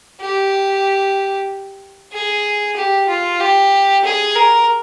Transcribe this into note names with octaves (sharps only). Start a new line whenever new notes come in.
G4
G#4
G4
F4
G4
G#4
A#4